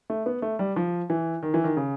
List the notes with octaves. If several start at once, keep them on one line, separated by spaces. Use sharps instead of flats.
A3
B3
A3
G3
F3
E3
D#3
E3
D#3
C#3